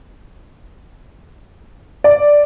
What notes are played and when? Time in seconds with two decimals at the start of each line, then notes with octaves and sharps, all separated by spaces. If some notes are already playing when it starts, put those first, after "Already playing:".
2.04 D5